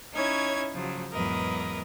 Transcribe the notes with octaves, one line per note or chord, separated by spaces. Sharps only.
C#4 D#4 E4 C#5 G#6
C#3 F3 F#3
E2 G#2 F#3 A#4 B4 D#5